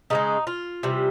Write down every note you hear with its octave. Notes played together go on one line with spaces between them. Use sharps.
C#3 F3 G#3 D#4
F4
C3 E3 G3